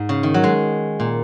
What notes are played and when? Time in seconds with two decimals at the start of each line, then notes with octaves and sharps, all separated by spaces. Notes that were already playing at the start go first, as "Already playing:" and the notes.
Already playing: G#2
0.09 C#3
0.23 D#3
0.34 F#3
0.44 G#3
1.00 A#2